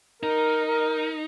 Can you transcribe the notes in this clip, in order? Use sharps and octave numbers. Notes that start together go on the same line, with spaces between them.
D#4 A#4
A#4